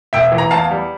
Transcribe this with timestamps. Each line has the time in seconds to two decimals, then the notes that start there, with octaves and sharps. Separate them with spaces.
0.13 E1 E5 G5
0.32 E3
0.38 A#5
0.51 E2 F5 A5
0.71 G3